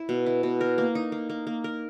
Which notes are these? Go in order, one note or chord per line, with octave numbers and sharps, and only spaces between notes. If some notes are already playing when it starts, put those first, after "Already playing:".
Already playing: E4
B2
E4
B2
A#4
A#3
D#4
A#3
A#3
A#3
A#4